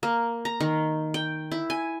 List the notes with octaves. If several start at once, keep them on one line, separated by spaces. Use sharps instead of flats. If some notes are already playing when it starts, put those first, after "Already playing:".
A#3
A#5
D#3
G5
E4
G#5